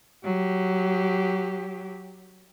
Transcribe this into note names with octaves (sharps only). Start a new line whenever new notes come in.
F#3 G4